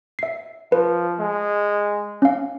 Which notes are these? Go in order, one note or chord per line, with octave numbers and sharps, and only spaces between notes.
E5 C7
F3 B4
G#3
C#4 F5